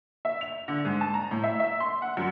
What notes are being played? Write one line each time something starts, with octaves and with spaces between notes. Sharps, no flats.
E5
F7
D3
G#2
A5
A#5
A2
E5
E5
C6
F#5
F#2